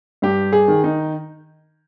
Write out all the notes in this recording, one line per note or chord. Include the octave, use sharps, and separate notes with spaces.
G2 G4
G#4
D#3
D#4